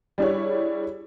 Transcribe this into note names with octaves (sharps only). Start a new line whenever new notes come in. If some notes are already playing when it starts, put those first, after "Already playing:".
G3 D4 E4 G#4 C#5